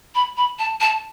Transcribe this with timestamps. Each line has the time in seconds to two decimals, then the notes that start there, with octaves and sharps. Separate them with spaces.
0.14 B5
0.37 B5
0.58 A5
0.80 A5